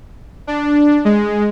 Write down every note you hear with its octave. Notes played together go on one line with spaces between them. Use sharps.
D4
G#3